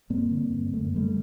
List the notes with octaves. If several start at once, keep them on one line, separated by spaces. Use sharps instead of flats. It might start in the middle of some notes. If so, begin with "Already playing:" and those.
G2 A#3 C4
D3
G2
F#2 A3
A#3
D3 G3 A3